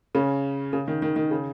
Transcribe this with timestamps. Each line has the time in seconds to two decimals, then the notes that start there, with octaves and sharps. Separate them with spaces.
0.15 C#3 C#4
0.73 C#3
0.88 D#3
1.02 D#3
1.16 D#3
1.31 C#3